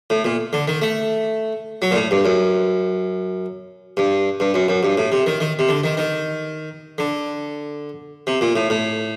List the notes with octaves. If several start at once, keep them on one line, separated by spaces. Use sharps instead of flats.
A2
A#2
D3
D#3
A3
F#3
A#2
A2
G2
F#2
G2
G2
F#2
F#2
G2
A2
C3
D#3
D#3
C3
D3
D#3
D#3
D3
C3
A#2
A2
A2